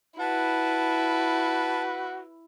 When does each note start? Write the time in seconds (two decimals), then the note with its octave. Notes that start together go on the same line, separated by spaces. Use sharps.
0.20 E4 F#4 B4 A5